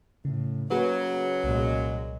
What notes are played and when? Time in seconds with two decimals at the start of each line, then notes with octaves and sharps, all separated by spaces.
0.25 A2 C#3
0.70 C#3 F#3 A#3 F#4 G#4 B4
1.44 C2 A#2 G#3